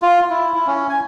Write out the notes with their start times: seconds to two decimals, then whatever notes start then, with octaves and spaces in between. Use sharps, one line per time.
0.02 F4
0.30 E4
0.54 E4
0.67 C#4
0.89 G#5